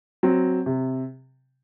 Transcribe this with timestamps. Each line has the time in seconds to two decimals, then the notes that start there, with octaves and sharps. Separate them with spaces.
0.23 F#3 C4
0.66 C3